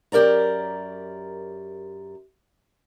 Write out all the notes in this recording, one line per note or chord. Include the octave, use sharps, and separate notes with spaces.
F#2 G4 A#4 D5 A#5